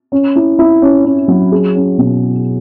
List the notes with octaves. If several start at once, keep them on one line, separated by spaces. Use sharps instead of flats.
C#4
E4
E4
C#4
C#4
F#3
G#4
C#4
B2